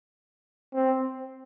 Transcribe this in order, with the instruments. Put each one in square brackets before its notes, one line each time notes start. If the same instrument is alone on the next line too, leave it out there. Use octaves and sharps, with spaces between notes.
[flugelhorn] C4